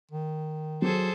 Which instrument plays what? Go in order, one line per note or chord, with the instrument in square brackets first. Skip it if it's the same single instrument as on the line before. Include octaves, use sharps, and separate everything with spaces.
[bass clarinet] D#3
[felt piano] F#3 [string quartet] G#4 A4 C5